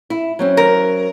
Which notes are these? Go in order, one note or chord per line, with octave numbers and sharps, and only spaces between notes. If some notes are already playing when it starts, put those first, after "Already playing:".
E4
F#3 C4 C#4
A#4